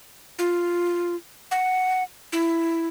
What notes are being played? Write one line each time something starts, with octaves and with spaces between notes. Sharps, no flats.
F4
F#5
E4